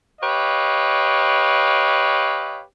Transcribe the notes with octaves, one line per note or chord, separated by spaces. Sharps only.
G4 B4 C#5 D#5 F5